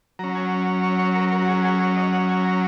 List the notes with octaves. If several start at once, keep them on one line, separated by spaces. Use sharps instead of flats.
F#3 C#4 A#5
G#5
C#5
C#5
A#4
A#4
F#4
G#4
G#4
C#5
D#5
F#5
G#5
A#5